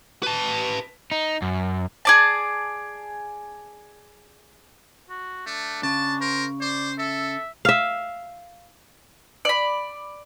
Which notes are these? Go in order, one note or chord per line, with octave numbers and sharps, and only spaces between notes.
B4 A5
D#4
F#2
G#4 D5 A5
F#4
A3 D4
C#3 A5
A#4 C5
C5 D5
A4 E5
E5 F5
D5 B5